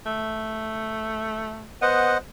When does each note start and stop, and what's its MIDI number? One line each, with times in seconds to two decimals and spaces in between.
0.06 1.69 57
1.82 2.15 59
1.82 2.18 72
1.82 2.18 75
1.82 2.18 78